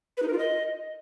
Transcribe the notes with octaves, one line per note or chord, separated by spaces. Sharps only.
B4
D#4
A#4
F4
D#5